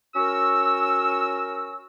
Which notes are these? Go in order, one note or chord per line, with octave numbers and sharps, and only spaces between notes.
C#4 F#4 A#4 E6